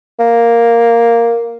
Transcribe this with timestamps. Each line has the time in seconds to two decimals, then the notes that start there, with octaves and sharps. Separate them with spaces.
0.19 A#3